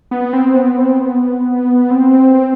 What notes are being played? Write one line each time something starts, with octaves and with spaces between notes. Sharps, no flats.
B3
C4
B3
C4
B3
C4